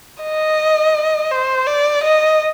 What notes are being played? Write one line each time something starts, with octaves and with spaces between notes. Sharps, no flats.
D#5
C5
D5
D#5